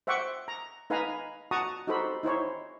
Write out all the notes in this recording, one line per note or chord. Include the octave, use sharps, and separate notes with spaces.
C5 E5 F#5 G5 C#6 D6
A#5
D#4 B4 F5 G#5 A#5 B5
F#4 F#5 A5 A#5 C#6 D#6
D#4 F#4 G4 A4 C5 B5
D#4 E4 C5 C#5